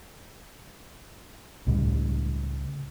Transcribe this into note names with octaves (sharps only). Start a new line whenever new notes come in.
C#2 A2 C#3 G3